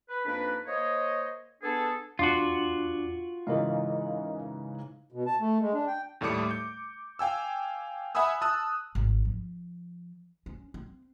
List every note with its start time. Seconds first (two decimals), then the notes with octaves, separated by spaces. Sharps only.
0.09 B4
0.25 F2 A#3 D4 D#4 B4
0.66 A#3 C5 C#5 D#5
1.62 B3 D4 G#4 A4
2.19 E2 D4 F4 F#4 D6
3.47 G#2 C#3 E3 A#4 D#5 F5
5.12 B2
5.26 A5
5.40 A3
5.61 G#3
5.74 D4
5.87 G5
6.21 D#2 A2 G3 A3 D6 C#7
6.51 G6
7.19 F5 G5 G#5 E6
8.15 E5 F#5 G#5 B5 D#6 E6
8.42 A5 D#6 E6 F#6
8.95 G#1
9.25 F3
10.46 C#4
10.74 C4